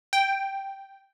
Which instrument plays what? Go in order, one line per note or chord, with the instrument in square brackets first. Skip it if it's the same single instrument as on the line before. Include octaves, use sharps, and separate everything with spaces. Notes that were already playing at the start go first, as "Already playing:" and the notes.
[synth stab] G5